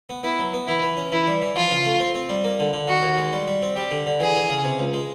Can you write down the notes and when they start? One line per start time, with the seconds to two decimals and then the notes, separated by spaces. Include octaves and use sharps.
0.09 B3
0.23 B3 E4
0.39 F#3
0.53 B3
0.67 E3 E4
0.82 E3
0.97 C#4
1.12 E3 E4
1.27 G3
1.42 E3
1.55 F3 F4
1.71 C#3
1.85 A3
2.00 C4
2.14 C4
2.29 G3
2.44 A#3
2.59 D3
2.73 D3
2.88 D#3 F#4
3.03 D#2
3.17 G#3
3.32 G3
3.47 G3
3.62 C4
3.76 G3 G4
3.91 D3
4.06 D3
4.20 E3 G#4
4.35 E3
4.49 C#3
4.64 C3
4.79 C#2
4.93 G#3